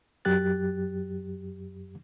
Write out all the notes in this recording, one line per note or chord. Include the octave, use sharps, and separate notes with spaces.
F#2 F#3 G4 F#6 A6